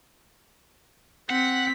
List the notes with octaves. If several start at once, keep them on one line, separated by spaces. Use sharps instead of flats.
C4 F#5 B6